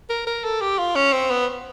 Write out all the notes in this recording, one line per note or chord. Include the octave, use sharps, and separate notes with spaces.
A#4
A#4
A4
G4
F4
C#4
C4
B3